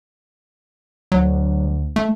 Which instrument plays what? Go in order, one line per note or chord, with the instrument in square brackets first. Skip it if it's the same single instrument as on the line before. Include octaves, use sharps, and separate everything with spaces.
[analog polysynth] D2 [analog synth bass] F#3
[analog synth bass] A3